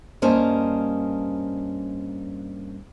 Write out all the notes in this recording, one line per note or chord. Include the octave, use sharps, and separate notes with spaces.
G2 A#3 C#4 C5 D#5 A5